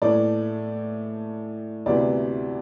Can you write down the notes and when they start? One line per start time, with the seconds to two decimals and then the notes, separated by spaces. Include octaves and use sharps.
0.02 A2 E3 A3 D5
1.86 D2 C3 E3 B3 D5